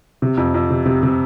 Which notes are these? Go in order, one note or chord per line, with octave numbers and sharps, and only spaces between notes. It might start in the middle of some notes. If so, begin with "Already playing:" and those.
C3
F2
F2
C3
C3
C3